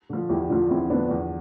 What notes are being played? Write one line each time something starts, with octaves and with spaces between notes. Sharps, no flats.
D3 F3
E2 E4 G4
E4
D3 F3 D4 F4
E2 C4 E4
D3 F3 B3 D4
E2